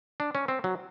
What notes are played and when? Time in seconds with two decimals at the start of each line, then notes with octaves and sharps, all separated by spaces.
0.20 D4
0.35 C#4
0.48 C4
0.64 F#3